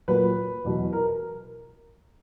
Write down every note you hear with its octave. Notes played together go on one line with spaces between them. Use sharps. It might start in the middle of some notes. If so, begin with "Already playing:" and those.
A#2 F#3 B4
E2 B2 F#3
A#4